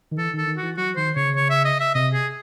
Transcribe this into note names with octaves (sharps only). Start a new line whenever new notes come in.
D#3
E3 A4
D#3 A4
D#3
F#4
E3
F#3 F#4
D#3 C5
C#3 C#5
C#5
E5
D#5
E5
C3 D#5
G#4